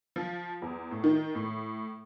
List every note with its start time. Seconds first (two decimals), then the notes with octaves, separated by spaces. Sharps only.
0.16 F3
0.62 E2
0.91 A2
1.04 D#3
1.35 A2